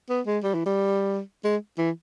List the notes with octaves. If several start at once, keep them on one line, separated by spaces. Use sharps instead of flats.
B3
G#3
G3
E3
G3
G#3
E3